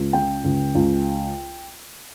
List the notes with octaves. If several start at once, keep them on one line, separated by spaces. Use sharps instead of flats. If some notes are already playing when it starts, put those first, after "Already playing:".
Already playing: C#2
C#3 G5
C#2
C#2